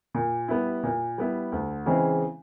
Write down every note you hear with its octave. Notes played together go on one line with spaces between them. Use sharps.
A#2
G3 B3 E4
A#2
G3 B3 E4
D2
C#3 E3 G#3 C4